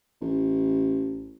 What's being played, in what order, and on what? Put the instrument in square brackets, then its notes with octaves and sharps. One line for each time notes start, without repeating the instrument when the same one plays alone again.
[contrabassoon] A1